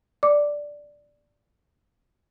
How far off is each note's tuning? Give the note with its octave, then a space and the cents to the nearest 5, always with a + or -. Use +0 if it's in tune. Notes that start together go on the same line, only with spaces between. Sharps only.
D5 +0 D6 +0